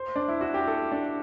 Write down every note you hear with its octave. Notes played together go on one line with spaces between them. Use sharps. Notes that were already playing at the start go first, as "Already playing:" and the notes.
Already playing: C5
D4
E4
F#4
G4
A4
D4